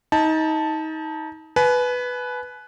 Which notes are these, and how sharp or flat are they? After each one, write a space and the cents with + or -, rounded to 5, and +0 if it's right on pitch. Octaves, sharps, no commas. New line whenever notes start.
D#4 +25 A5 +0
B4 +0 G#5 +40